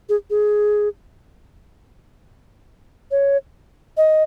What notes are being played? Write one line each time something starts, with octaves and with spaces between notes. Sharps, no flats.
G#4
G#4
C#5
D#5